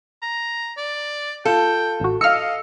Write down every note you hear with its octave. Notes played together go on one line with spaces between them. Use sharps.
A#5
D5
F4 A4 G5
A1 F#4
D#5 F5 E6 F6 C#7